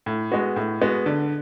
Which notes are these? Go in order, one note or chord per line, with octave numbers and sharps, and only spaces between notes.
A2
G#3 B3 F#4
A2
G#3 B3 F#4
D3